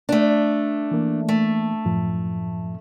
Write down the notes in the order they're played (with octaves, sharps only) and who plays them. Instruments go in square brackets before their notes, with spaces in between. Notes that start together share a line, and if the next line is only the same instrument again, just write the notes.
[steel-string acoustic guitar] A3 D4
[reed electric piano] E3 A#3
[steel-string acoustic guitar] A3
[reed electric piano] F#2 A2 F3